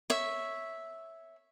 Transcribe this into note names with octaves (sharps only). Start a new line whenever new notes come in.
C#5 E5